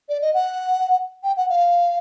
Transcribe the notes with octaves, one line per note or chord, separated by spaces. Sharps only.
D5
D#5
F#5
G5
F#5
F5